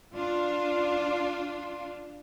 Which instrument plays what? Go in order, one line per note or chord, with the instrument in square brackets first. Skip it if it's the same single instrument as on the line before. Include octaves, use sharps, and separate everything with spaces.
[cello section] D4 F4